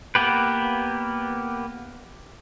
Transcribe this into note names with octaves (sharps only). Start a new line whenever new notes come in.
A#3 B3 G4 B4